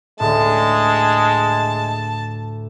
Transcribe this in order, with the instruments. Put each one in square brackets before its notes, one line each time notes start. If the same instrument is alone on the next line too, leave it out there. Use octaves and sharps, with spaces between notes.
[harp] D2 A2 [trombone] G#3 [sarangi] A5